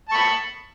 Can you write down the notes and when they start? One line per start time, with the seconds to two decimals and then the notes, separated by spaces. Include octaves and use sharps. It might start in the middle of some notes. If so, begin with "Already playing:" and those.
0.09 A5
0.12 C#6
0.14 B5